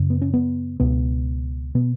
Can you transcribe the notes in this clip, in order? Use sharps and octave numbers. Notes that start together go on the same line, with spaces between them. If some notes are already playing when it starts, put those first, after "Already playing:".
Already playing: F#2 C#3
B3
C#4
B3
C#2 B2 B3
B2 B3